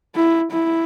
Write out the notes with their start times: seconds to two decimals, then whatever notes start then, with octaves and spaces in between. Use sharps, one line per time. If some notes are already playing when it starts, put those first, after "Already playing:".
0.15 E4
0.51 E4